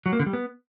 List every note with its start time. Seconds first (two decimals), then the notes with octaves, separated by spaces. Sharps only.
0.06 F#3
0.13 A#3
0.20 D3
0.26 G3
0.33 B3